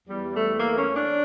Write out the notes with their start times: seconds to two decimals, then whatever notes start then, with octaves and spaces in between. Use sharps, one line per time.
0.08 E2 E3 G3
0.34 A3
0.59 A#3
0.77 C#4
0.94 D4